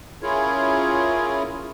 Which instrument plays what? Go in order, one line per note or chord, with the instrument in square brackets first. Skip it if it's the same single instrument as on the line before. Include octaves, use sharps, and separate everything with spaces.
[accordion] C#4 E4 F4 G#4 A#4 C#5